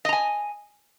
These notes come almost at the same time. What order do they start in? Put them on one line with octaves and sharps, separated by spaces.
D#5 A#5 G#5